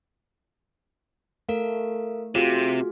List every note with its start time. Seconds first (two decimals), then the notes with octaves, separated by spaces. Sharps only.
1.49 A3 A4 A#4 F5
2.35 C3 F4 F#4 G#4